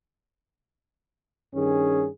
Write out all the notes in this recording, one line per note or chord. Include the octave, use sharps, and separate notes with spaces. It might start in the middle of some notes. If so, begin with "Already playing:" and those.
G2 D#3 C#4 G#4